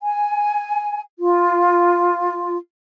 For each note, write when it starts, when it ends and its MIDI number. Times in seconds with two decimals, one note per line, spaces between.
0.01 1.00 80
1.19 2.56 65